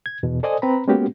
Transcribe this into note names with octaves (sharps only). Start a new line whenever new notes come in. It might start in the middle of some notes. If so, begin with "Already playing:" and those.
G#6
E2 B2
A4 C5 D5 D#5 G#5 D#6
C4 B4 A#5 B5
G#3 A#3 B3 C#4 F#4 G4